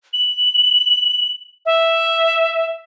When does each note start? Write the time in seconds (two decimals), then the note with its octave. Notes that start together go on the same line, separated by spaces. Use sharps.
0.13 F#7
1.66 E5